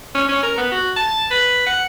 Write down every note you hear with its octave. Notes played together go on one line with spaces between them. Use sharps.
C#4
C#4
A#4
B3
F#4
A5
B4
F#5